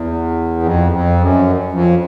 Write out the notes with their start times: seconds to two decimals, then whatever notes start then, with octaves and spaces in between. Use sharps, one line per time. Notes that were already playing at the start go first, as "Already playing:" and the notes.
Already playing: E2
0.63 F2
0.92 F2
1.21 F#2
1.72 F2